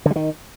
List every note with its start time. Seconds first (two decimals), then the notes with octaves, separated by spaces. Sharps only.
0.06 D3
0.11 G3
0.16 D#3